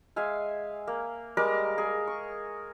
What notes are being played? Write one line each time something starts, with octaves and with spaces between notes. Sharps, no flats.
G#3 E5 F5 G#5
A#3
G3 G#3 A#4 D6
G#4
C#6